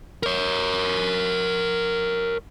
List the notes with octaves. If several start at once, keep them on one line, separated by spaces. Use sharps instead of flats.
A#4 C#5